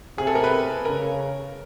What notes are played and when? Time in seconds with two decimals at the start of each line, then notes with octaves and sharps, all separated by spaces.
0.18 C3 G#4
0.27 A4
0.35 A#4
0.44 B4
0.85 C#3 A#4